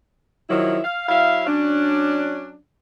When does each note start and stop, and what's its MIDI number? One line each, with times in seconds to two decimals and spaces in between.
0.49 0.79 51
0.49 0.79 53
0.49 0.79 54
0.49 0.79 64
0.84 1.07 77
1.08 1.45 54
1.08 1.45 64
1.08 1.45 76
1.08 1.45 77
1.47 2.55 54
1.47 2.55 61
1.47 2.55 62